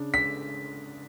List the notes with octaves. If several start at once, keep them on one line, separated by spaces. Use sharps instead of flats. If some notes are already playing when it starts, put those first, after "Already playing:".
Already playing: C#3 D4
B6